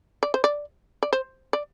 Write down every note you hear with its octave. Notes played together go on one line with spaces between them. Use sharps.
D5
C5
D5
D5
C5
D5